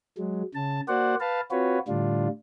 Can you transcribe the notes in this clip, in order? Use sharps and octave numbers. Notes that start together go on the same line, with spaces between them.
F#3 G#3
C#3 A5
A#3 F#4 C5 D5 F#5
B4 F5 A5
C4 F4 F#4 B4 C#5
A2 D3 G3 D4 F4